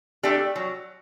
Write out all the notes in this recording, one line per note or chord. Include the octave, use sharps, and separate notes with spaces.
A3 D4 G4
F#3